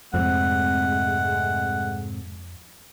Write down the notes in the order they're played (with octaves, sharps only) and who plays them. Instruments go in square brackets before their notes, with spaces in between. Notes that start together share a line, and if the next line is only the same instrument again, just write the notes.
[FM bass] F2 [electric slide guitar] G#2 C3 C4 [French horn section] G#3 A3 [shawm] F#5